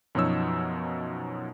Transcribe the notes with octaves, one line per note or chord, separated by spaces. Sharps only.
F#2 B2 F3 D#4 C#5 E6